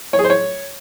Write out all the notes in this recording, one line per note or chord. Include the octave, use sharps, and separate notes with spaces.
C#5
G#4
C5
C#5